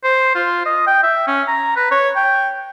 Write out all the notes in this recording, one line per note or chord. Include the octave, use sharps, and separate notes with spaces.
C5
F4
D#5
G5
E5
C#4
A#5
B4
C#5
G5